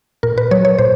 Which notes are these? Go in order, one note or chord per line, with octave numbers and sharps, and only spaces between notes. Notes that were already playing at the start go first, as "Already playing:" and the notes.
A#2 A#4
B4
F#3 C#5
C#5
A#2 C5